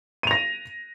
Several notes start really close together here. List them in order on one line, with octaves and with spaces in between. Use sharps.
D#7 F7 A#6